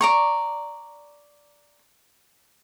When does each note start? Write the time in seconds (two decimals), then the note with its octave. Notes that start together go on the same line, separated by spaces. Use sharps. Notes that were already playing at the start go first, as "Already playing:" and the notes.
0.01 D5 A#5 C#6